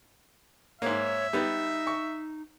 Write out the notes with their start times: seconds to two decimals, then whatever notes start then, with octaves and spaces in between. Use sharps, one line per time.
0.82 G#2 A#3 C#5 E5
1.33 G3 B3 D#4
1.87 C#6